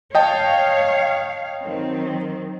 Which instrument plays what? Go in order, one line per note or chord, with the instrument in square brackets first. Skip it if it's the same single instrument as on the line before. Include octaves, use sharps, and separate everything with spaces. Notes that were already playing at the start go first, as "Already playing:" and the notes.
[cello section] C#5 F5 [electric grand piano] D#5 G5 A5
[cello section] D#3 F#3 C4